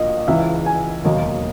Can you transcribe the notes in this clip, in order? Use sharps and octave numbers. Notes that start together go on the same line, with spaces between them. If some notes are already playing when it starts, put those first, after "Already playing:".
Already playing: A#1 A#2 A#3 D#5
C#2 C#3 E3 E5
G#5
E1 D#2 D#3 F#3 A#3 D#5